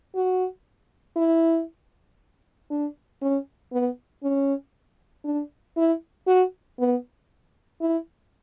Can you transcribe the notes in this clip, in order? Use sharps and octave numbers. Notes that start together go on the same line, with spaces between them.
F#4
E4
D4
C#4
B3
C#4
D4
E4
F#4
B3
E4